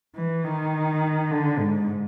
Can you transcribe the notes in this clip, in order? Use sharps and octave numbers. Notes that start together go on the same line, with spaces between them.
E3
D#3
D3
G#2